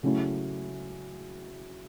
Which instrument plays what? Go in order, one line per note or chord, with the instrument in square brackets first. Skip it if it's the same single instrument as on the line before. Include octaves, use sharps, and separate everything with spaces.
[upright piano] C#3 F#3 A3 C#4 E4